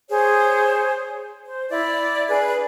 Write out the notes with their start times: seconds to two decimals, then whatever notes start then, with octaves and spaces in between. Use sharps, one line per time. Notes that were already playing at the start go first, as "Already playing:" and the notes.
0.09 G#4 C5 C#5
1.46 C5
1.69 E4 D5
2.28 D4 G#4 B4